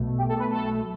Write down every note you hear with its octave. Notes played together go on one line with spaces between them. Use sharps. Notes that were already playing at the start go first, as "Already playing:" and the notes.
Already playing: B1 B2 A3
G4
A4
B4
A4